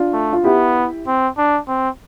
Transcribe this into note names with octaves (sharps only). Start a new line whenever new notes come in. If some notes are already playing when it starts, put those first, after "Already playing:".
Already playing: D4 F4
A3
F4
B3 E4 G4
C4
D4
C4